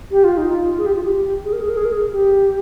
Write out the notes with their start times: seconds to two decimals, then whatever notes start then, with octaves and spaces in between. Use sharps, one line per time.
0.11 G4
0.24 F4
0.37 D#4
0.51 F4
0.78 G#4
0.86 G4
0.95 F4
1.04 G4
1.45 G#4
1.53 A#4
1.61 G#4
1.70 A#4
1.77 G#4
1.85 A#4
1.93 G#4
2.12 G4